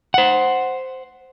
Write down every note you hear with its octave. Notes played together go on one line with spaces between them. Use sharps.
C5 F#5